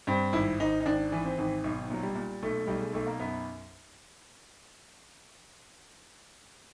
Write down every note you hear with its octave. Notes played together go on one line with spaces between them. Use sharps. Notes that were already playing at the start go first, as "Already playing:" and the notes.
G2 C4
G#1 E4
G#1 D#4
D#4
G#1 D4
E3
C4
G#1
B1
A#2 F#3
G3
A#2
B1 A3
B1 G3
G#3
B1 A3
A#3
F#2 B3